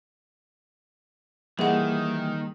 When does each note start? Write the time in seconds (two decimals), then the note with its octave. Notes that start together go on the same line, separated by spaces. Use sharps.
1.59 D#3 E3 G3 A#3 G#4 F#5